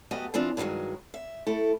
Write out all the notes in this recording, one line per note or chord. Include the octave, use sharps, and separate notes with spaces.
F#2 A3 B3 F#4 G4 D#5
E3 F3 C4 D4 F4
G2 D3 D#3 F#3 G#3
E5
A3 E4 A4